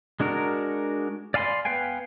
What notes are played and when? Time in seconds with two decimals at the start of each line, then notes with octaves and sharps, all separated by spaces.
0.20 G#3 D4 F#4 A#4
1.34 D5 F5 G#5 B5 C6
1.65 B3 B4 F5 G5 G#5